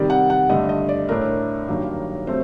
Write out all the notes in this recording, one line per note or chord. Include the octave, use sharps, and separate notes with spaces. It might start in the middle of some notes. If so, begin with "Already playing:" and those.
Already playing: C3 D#3 G3 D5
F#5
F#5
G2 D3 A3 D#5
D#5
D5
A2 A3 D4 A#4
G2 D#3 F#3 A#3
C3 F#3 A3 C4 C5